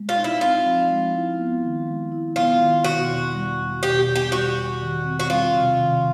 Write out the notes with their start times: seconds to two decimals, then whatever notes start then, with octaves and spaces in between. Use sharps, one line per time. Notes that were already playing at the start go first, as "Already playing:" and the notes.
Already playing: G#3
0.09 F4
0.16 D#4
0.24 E4
0.41 C4 F4
0.65 F3
0.90 G#3
1.14 E4
1.39 B3
1.63 D#3
1.87 G#3
2.12 E4
2.36 B3 F4
2.60 D#3
2.84 B2 F#4
3.10 E2
3.34 G3
3.58 E2
3.83 B2 G4
4.07 E2
4.15 G4
4.31 G3 F#4
4.56 E2
4.80 D#3
5.05 C4
5.20 F#4
5.29 G3 F4
5.54 C3
5.78 D#3